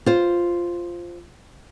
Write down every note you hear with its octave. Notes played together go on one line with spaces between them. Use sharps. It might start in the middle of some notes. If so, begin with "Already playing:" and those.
F4 C5